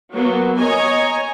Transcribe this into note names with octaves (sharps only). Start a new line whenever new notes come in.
F#3 A#3 B3
C#5 D#5 G#5 A#5